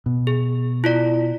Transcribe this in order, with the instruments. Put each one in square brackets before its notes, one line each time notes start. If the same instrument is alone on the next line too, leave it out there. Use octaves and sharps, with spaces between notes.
[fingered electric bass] B2
[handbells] G#4
E4 F4 D5